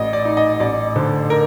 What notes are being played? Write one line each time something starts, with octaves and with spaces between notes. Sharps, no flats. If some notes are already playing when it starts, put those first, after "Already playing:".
Already playing: A1 D5 D#5
D5
D#4
D#5
A1 D5
D3 C5
A#4